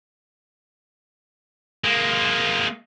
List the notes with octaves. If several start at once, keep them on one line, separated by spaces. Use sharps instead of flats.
G#3 A#3